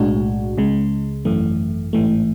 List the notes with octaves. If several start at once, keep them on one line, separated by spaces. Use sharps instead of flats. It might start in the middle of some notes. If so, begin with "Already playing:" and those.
Already playing: B1 A2 G#3 D4 F#4
C#2 C#3 G#3
G#1 F#2 E3 A3
A1 G#2 E3 A3